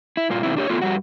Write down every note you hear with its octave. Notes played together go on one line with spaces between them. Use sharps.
E4
G2 A#2 F4
B2 D#3 C4 E4
D4 G4 C#5
A3 B3 F4
G2 G3 F#4